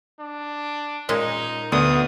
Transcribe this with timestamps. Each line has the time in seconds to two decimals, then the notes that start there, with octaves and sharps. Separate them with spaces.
0.19 D4
1.09 A#2 G#3 C#4 D#4
1.72 D2 D3 B3 D#6